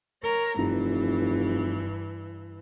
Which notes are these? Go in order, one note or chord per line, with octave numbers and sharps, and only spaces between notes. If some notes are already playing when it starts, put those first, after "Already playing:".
A#4 C#5 A#5
F1 G2 E3